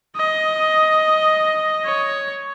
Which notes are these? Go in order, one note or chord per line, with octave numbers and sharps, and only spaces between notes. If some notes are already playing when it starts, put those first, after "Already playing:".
D#5
C#5